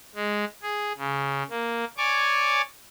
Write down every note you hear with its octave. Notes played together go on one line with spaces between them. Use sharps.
G#3
G#4
C#3
A#3
C#5 D5 G#5 D6